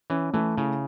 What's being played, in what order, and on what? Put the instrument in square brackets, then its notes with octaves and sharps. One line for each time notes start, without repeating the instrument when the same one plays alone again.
[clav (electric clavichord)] E3 [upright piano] C#4
[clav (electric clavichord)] E3 [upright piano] A3
[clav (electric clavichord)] C#3 [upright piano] E4